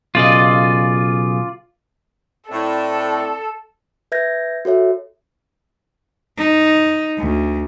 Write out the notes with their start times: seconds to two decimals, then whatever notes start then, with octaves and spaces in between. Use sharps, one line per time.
0.15 B1 C#3 F4 D5 D#5
2.51 A2 C4 A4 D5
4.12 B4 E5 G6 G#6 A#6
4.65 F#4 A4 C#5 E5
6.38 D#4
7.19 D2